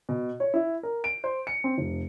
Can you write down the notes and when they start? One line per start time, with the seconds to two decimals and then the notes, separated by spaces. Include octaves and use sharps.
0.09 B2
0.40 C#5
0.54 E4
0.83 A#4
1.04 D7
1.24 C5
1.47 C#7
1.64 C4
1.78 F1